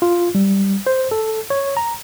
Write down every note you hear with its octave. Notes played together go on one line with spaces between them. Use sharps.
F4
G3
C5
A4
C#5
A#5